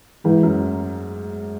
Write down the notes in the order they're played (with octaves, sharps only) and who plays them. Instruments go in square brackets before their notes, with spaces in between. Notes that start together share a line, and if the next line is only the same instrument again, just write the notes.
[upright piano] G#2 [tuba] E3
[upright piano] F#2